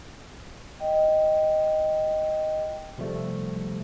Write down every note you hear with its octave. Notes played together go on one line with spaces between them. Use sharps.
D#5 G5
C3 F3 G3 A3